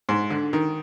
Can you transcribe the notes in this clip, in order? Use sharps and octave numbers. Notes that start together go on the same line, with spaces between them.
G#2
D3
D#3